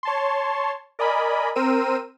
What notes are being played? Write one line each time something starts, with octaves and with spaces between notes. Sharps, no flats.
C#5 A5 C6
A#4 D5 D#5 G#5 B5
C4 A#4 C5 E6 D#7